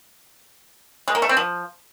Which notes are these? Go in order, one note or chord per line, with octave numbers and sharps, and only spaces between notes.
G#3
A#3
A3
C4
F3